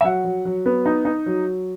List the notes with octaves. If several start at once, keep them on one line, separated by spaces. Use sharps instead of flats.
E5
F#3 F#5
F#3
F#3
B3
D#4
D#4
F#3